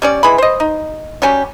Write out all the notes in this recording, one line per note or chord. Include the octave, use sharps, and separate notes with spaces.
G3 C#4 D5
E3 G#3 B5
C5 D#5
D#4
F#3 G3 C#4 G4